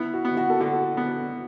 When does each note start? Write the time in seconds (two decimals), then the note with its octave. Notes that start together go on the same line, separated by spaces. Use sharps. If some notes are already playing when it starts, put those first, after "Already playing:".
Already playing: B3 E4
0.13 F#4
0.25 B3
0.37 F#4
0.50 A4
0.60 D3 F#4
0.97 B3